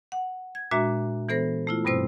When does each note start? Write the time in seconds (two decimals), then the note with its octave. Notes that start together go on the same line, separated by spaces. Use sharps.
0.12 F#5
0.55 G#6
0.71 A#2 G#3 D4 F#4 E5 A#5
1.29 E3 B3 A4 C5 A#6
1.67 A3 E4 F4
1.85 G2 B2 G3 C4 C5 E6